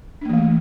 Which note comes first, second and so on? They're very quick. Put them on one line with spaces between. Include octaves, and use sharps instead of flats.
D4 A#3 E3 A3